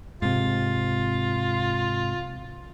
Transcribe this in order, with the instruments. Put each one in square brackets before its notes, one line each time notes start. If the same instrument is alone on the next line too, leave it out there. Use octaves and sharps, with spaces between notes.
[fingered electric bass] G#2 C3 [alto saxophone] F4